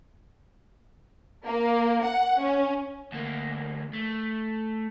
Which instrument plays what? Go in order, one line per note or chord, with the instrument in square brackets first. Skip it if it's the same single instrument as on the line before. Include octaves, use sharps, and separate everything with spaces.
[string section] A#3
F#5
C#4
[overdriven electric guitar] D2 A#3
A3